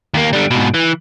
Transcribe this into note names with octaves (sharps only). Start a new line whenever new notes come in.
D#2 A#3
D3 G3
G#2 B2
E3